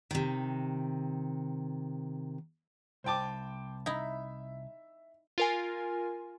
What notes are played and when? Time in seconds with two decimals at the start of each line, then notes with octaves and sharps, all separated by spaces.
0.11 C3 D#3
3.04 C2 C5 G5 A5 D6
3.86 D#4 E4 E5
5.38 F4 A#4 G#5